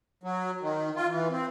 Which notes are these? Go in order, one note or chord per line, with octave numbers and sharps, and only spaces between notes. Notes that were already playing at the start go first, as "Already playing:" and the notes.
F#3
D#3
F4
E3
C4